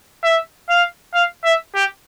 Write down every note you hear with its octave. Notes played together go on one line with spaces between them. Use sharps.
E5
F5
F5
E5
G4